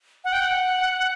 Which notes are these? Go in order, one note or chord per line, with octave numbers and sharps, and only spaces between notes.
F#5
G5
F#5